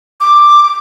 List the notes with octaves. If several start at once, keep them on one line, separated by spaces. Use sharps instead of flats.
D6